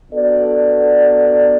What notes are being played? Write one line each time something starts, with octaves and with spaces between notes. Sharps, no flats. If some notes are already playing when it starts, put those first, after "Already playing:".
B3 D4 F#4 A4 D5